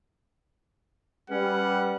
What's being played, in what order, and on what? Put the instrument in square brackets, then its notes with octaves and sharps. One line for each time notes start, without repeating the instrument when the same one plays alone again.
[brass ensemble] G3 [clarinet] C#4 [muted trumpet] B4 [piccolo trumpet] F#5